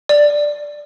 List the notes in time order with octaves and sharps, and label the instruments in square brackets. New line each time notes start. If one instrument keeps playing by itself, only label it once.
[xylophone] D5